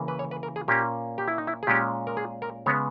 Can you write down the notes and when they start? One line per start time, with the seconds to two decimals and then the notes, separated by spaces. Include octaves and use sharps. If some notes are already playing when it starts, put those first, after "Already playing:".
Already playing: C#3 E3 A#3 C#4
0.08 B4
0.19 C#5
0.31 B4
0.43 A#4
0.56 G#4
0.68 A#2 A#3 C#4 G4
1.18 G4
1.28 E4
1.38 D#4
1.47 E4
1.63 G#4
1.67 A#2 G#3 C#4 G4
2.07 A#4
2.17 G#4
2.42 A#4
2.66 C#3 G#3 B3 C#5